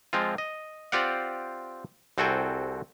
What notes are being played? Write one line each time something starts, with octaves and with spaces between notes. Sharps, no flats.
F3 G#3 C4 F4
D#5
C4 F4 G4 D5 F5 F#5
C2 C4 F#4 A4 G5 G#5